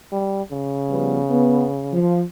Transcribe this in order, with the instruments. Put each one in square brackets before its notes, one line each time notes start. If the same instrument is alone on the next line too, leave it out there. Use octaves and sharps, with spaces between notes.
[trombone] G3
C#3
[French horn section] F3 G3 B3
B3
F3